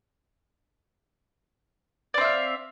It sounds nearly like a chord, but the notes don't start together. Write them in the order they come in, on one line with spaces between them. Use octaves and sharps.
D5 C4 E5 F5